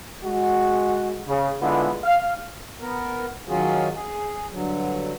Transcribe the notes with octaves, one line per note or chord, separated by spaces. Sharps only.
G#3 F#4
C#3
D3 G#3 B3 E4 F4
F5
B3 A#4
D#3 F#3 C#4 F4 F#4 G#4
G#4
G2 D3 F#3